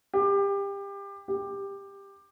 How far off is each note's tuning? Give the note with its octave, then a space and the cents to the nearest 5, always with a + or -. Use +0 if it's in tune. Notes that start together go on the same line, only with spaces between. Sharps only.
G4 +25
G4 +15